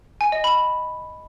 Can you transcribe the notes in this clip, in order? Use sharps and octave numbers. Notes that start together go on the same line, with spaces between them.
G#5
D#5
B5